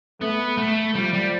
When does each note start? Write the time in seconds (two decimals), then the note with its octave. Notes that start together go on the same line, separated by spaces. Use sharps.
0.21 A3 B3
0.57 A3
0.95 F3 G3
1.13 G3